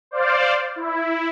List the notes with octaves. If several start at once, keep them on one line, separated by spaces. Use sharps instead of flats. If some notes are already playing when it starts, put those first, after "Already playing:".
C5 D5 F5
E4